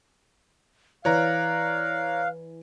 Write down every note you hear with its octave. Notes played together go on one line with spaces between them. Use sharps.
E3 C#5 D5 F5 A#5 F#6